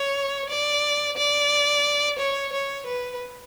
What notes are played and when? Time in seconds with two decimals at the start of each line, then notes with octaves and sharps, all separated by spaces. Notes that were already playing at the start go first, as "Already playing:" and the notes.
Already playing: C#5
0.50 D5
1.17 D5
2.19 C#5
2.53 C#5
2.86 B4